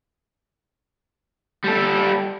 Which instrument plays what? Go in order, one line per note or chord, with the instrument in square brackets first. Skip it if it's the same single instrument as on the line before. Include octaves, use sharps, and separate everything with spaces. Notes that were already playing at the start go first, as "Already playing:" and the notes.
[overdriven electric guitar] G3 A4